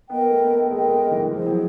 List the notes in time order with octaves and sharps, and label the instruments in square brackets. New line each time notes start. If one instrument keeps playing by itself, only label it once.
[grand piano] B3 [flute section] A#4 D#5 G5
[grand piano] A3
A3
[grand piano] G#3 [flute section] A#4 D#5 G5
[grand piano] A3
E3
[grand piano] F3 [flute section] E4 G#4 C5
[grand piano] F#3